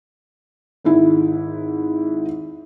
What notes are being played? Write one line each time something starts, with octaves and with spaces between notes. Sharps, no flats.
G#1 G#2 E4